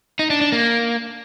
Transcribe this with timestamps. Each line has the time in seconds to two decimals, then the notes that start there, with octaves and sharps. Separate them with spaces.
0.19 D#4
0.30 D4
0.41 D4
0.52 A#3